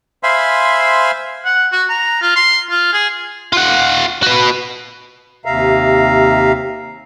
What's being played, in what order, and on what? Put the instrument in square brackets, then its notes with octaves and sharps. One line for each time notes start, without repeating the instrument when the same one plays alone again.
[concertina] C5 E5 F5 G#5 B5 C6
[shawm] F#5
F#4
A#5
F4
C6
F4
G#4
[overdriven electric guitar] F4 F#5
F#4 B4
[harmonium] D#2 C3 E5 F5 A#5